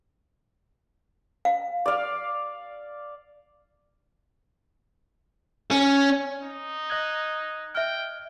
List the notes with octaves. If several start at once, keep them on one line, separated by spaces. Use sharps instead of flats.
F5
D5 F5
C#4
D#4
D#5 F#6 G#6
E5 G5 F6